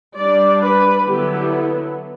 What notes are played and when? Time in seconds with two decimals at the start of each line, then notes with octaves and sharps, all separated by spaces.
0.17 G3 D4 D5
0.61 B4
1.05 D3 F#3 B3 E4 G4